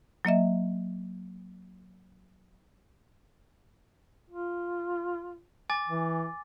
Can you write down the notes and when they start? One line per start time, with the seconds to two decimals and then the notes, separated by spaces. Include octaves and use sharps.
0.25 F#3 A#3 D#5 E5
4.30 F4
5.70 G#5 D6 A6
5.88 E3